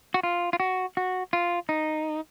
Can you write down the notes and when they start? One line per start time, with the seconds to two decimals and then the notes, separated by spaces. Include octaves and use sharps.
0.14 F#4
0.23 F4
0.53 F4
0.60 F#4
0.97 F#4
1.33 F4
1.69 D#4